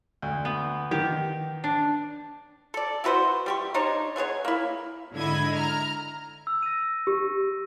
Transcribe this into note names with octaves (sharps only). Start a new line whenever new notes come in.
D2
B3
D#3 G4
D4
A4 D5
E4 F#4 B4 C5
G3 G4 C#6
D4 D#4 C5 C#5
A3 B3 G#4 C#5
A#3 E4
G#2 D3 E4 D#5 B5 G#6
A#5 F6
E6
A#6 D#7
G4